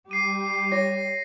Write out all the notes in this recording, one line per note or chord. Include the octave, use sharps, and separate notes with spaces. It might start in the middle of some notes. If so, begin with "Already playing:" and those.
G3 G4 D6 C7 D#7
C#5 A#6